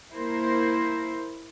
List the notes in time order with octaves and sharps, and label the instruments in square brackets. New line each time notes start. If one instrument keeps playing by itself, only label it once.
[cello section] A#3 E4 A#4 C5